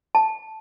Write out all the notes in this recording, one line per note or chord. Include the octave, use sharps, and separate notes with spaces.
A5